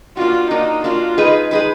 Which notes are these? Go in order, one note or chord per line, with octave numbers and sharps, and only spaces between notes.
A#3 D4 F4 F#4
A#3 D4 D#4 F#4
A#3 D4 F4 F#4
G#3 D#4 G#4 B4
G#3 D#4 G#4 B4